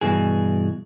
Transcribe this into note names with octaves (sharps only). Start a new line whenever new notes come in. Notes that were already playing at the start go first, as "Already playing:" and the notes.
G2 B2 E3 G#4